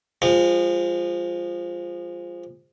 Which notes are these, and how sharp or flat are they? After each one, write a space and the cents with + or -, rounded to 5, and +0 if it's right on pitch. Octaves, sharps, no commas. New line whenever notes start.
F3 +0 G#3 -30